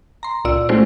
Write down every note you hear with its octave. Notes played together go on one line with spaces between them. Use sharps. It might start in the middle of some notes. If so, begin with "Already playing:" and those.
A#5 C6
C#2 A#2 F4 D5 E6
G#3 A3 C#4 E4 F#4 C5